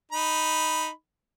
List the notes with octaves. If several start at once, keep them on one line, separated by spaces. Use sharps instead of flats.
D#4 B5